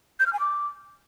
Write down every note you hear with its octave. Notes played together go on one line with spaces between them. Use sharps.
G6
F6
G#5
D6